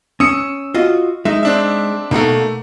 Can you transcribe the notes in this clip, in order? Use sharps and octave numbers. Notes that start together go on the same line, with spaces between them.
C#4 D#6 E6 C#7
F4 F#4 D#5
G#3 D#4 E5
C4 D4 E5
B2 A3 A#3 D#4 F#5